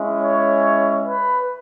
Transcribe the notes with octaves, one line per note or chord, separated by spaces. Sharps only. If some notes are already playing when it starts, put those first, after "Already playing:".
Already playing: G#3 C#4 E4
C#5
B4